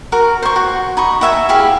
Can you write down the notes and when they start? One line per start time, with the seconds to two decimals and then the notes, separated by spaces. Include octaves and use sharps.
0.12 F#4 A#4
0.42 C5 C#6
0.56 F#4
0.97 D#4 B5 C#6
1.21 F#4 E5 G5 G#5
1.49 E4 G4 G#4 F5